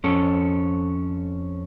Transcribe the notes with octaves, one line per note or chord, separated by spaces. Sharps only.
F2 C#4 A4